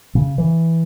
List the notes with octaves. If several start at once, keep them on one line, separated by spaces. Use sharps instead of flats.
C#3
E3